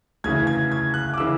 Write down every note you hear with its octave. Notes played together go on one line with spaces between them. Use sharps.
D2 C#3 E3 G#6
G#6
G#6
F#6
D6
C#3 E3 E6